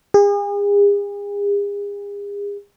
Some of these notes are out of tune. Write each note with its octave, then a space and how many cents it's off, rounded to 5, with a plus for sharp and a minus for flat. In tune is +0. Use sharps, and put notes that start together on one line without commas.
G#4 -40